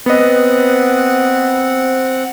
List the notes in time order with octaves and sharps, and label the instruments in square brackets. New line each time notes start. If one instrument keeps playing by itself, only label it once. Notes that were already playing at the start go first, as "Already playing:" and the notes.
[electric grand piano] B3 D#5 [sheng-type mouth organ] C4 F#5